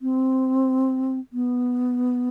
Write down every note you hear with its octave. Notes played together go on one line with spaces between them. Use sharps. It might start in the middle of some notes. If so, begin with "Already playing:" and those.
C4
B3